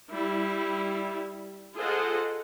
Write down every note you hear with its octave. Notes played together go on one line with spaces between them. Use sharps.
G3 E4
F4 G#4 A4 C5 D#5 F#5